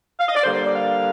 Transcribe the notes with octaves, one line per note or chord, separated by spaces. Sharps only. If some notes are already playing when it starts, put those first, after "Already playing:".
F5
D#5
D5
D3 G3 A#3 C5
C5
D5
F5